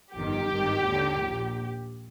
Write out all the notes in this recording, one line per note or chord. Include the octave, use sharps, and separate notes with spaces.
G1 F2 D#3 G4
G#1 G2 D#3
D#2 D3
A#1 A#2